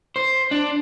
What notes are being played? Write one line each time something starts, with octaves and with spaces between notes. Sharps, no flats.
C5
D4